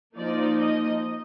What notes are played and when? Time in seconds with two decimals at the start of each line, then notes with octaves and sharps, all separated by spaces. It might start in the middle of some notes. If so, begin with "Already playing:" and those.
0.15 F3 A#3 D#4 D5
0.59 D#5